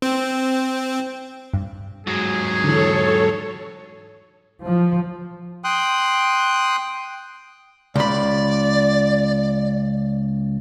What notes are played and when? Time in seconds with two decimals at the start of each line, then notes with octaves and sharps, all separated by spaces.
0.02 C4
1.53 G2
2.07 G#2 F#3 G#4
2.64 D3 E3 A4 C#5
4.63 F3
5.64 G5 C6 D#6 F#6
7.96 C#2 D5 B5